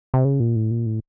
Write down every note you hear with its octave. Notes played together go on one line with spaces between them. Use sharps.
C3
C#3
A#2
A2
A#2
A2